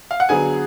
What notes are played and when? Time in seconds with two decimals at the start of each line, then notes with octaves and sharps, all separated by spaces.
0.11 F5
0.20 F#5
0.29 D3 F#3 B3 G#4 G#5